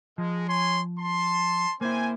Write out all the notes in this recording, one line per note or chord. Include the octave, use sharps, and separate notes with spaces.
F3 G#3
C#5 G#5 C6
A5 C6
A#3 C4 E4 C5 G#5